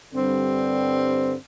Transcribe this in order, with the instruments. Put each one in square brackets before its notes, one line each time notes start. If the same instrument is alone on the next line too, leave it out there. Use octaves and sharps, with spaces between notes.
[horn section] G2 D3 G3 C4